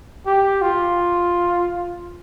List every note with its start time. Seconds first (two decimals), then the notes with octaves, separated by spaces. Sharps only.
0.26 G4
0.62 F4